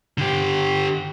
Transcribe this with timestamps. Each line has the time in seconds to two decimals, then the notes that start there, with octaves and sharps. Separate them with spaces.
0.18 D3 G4